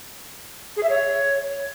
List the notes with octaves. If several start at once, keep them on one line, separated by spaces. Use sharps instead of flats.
G#4
E5
C#5